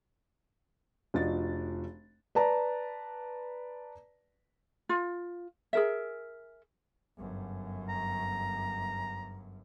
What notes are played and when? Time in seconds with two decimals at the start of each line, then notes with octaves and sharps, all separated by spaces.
1.14 F1 F3 D4 F#4 D#5 A6
2.35 B4 D5 A5 A#5
4.89 F4
5.73 G#4 A#4 E5
7.17 G1 F#2
7.89 A#5